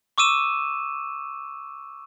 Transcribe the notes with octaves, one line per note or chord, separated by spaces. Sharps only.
C#6 D6 E6 D#7 E7